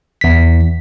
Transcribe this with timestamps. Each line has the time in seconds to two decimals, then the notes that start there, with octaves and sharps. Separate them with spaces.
0.21 E2 B6